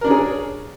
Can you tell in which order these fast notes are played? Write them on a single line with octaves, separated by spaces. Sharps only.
A#4 D4 C#5 G#4